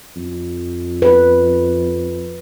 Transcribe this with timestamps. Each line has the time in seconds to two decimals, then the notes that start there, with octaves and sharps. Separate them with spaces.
0.16 F2
1.02 B4